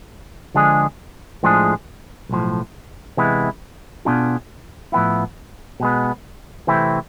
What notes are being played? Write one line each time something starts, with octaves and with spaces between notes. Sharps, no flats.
D3 F3 G#3 D4 G#4
A2 F3 G#3 D4 G#4
B1 A2 F3
C3 E3 G#3 B3 E4
B2 B3 D4 F4 G#4
A2 F3 B3 E4
B2 G#3 B3
C3 E3 A3 C4 E4